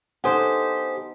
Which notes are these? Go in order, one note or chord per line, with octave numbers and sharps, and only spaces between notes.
B3 D#4 G4 A4 C5 F#5 G#5 D#6